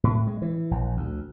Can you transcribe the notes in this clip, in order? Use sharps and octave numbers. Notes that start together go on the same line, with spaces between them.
A2
G#3
E3
A#1
D2